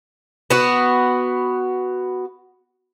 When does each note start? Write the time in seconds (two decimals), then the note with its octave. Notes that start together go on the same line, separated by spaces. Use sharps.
0.50 B3 F#4